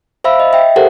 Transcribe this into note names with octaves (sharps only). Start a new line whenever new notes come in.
C5 E5 F5 B5 E6
D#5
E5 G5
G4 A4 A#4 C5 E5 F#5